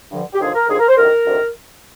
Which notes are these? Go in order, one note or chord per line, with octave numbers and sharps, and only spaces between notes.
G2 D3 F3
G4
D#2 D3 F3 G#4
A#4
D#2 D3 F3 G#4
A#4
C5
D2 C3 D#3 A#4
D2 C3 D#3